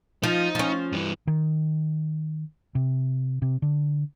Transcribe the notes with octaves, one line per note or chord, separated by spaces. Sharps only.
F3 D#4
F3 C#4
G2 E3
D#3
C3
C3
D3